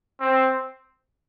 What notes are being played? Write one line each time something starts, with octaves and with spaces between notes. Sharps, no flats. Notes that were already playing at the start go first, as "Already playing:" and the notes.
C4